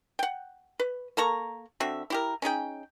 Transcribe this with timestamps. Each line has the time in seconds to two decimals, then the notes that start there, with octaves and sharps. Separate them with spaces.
0.19 F#5 G5
0.79 B4
1.17 A#3 A4 A#5 C#6
1.80 D3 C4 F#4 E5
2.10 E4 G4 A#4
2.42 C#4 D#4 G#4 G5